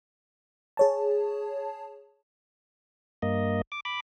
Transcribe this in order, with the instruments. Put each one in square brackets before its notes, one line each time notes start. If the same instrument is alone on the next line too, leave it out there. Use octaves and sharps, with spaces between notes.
[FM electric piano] G#4 C#5 A5
[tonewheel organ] G2 A#3 D#5
D6
B5 D6